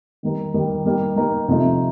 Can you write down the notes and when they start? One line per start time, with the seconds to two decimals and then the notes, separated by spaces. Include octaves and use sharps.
0.23 D#3 G3 A#3 D#4 A#4
0.54 D#3 G3 A#3 D#4 A#4
0.85 G3 A#3 D#4 A#4
1.16 G3 A#3 D#4 A#4
1.48 C3 F3 A3 D#4